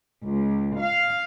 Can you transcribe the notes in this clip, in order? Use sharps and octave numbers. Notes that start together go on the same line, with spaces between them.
C#2
F5